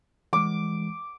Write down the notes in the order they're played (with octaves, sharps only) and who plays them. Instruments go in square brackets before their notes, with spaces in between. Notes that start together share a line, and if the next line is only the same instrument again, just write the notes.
[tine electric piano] E3 G#3 [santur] D6